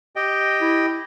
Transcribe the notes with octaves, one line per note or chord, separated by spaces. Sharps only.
G4 D#5 G5
E4